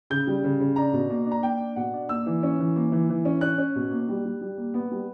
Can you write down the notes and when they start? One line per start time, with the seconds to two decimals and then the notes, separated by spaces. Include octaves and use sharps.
0.10 C#3 G6
0.27 G3
0.44 C#3
0.60 C#3
0.76 D4 A#5
0.93 B2
1.10 A#3
1.26 D4
1.32 A#5
1.43 A#3 G5
1.59 D4
1.76 B2 F#5
1.93 D4
2.09 A#3 E6
2.26 E3
2.43 C#4
2.59 E3
2.76 A#3
2.92 E3
3.09 E3
3.25 C#4
3.41 C#4 F#6
3.58 C#4
3.76 B2
3.91 A#3
4.09 G3
4.25 G3
4.41 G3
4.58 A#3
4.74 B3
4.91 G3